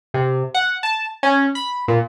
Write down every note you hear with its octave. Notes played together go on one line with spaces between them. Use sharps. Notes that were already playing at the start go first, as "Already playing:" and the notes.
C3
F#5
A5
C#4
B5
A#2